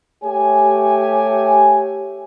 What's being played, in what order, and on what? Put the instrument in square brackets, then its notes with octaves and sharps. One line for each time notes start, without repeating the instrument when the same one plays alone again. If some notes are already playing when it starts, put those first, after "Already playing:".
[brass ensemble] A3 G4 C#5 G#5